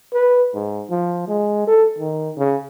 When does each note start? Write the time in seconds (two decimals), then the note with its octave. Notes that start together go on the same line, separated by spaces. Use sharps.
0.13 B4
0.54 G#2
0.90 F3
1.28 G#3
1.68 A4
1.99 D#3
2.38 C#3